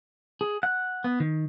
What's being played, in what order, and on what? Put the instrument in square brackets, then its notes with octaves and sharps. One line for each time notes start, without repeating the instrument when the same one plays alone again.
[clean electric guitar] G#4
F#5
B3
D#3